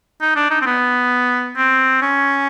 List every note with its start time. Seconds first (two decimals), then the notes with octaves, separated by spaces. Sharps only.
0.21 D#4
0.36 D4
0.51 D#4
0.62 C4
0.66 B3
1.57 C4
2.02 C#4